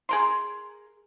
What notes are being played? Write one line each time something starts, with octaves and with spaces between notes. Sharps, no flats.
G#4 A#4 C6